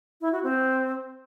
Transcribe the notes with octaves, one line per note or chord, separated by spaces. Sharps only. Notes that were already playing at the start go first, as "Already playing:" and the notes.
E4
F#4
C4